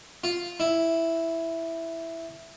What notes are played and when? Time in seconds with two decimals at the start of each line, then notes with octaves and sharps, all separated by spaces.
0.24 F4
0.60 E4